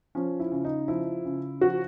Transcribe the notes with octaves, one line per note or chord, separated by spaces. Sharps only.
F3 C#4
E4
C#3
D#4
F3 E4
C#3
F3 F#4